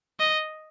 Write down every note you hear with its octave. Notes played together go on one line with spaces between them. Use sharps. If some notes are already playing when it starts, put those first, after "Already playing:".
D#5